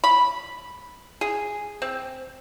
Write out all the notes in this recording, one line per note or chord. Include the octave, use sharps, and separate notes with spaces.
B5
G#4
C4